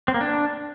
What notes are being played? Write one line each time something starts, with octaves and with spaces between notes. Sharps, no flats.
C4
A#3
D4